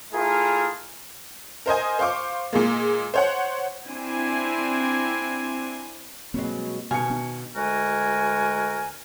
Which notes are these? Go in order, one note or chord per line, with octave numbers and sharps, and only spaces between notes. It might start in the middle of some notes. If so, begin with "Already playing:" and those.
A3 E4 F4 G#4 A#4
A#4 C5 D#5 G#5
C5 F5 C#6 D6
A#2 G#3 A#3
C5 C#5 F#5
C4 D4 E4 G#5
B2 F#3 G#3 A#3 C4
B2 D#3 F5 G#5 C#7
B3 D4
D2 G#3 F#4 A#4 G#5